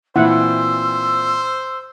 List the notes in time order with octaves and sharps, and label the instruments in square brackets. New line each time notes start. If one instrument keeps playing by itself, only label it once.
[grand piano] A#2 E3 C4 [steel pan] E4 F#5 [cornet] C5 [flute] E6